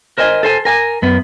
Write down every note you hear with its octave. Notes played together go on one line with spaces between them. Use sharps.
A#4 C5 D#5 G#5
A4 C5 G#5
A#4 G#5
F#2 B3